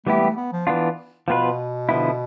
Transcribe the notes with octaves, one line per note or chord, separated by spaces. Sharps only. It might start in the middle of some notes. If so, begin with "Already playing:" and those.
E3 G3 A3 B3 E4 G4
A3
B3
F3
E3 B3 D4 F4
B2 F3 B3 F4 B4
D3 F3 B3 E4